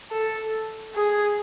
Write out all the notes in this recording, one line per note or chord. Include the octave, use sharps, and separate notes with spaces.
A4
G#4